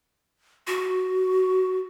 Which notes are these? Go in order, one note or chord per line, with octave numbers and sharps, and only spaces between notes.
F#4